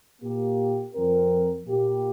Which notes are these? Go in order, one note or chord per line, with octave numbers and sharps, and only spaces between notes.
A#2 A#3 G4
F2 F3 C4 A#4
A#2 A#3 G4